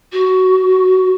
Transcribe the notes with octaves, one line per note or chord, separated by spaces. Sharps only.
F#4